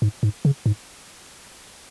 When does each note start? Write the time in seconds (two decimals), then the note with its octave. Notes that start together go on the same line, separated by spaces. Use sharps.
0.02 G#2
0.23 G#2
0.45 C#3
0.66 G#2